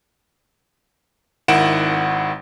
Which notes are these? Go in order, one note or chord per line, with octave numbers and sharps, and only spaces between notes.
G#1 D#3 E4 F#5 D7 E7